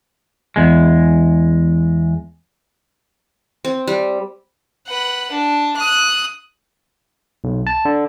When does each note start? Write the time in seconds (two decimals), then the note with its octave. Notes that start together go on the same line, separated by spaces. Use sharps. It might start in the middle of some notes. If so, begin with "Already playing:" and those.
0.56 E2 G#3
3.65 C4
3.88 G3
4.87 B4 F#5
5.31 D4
5.76 D#6 F#6
7.44 B1
7.67 A5
7.85 D3